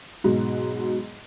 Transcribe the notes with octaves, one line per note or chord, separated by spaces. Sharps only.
G#2 B2 F#3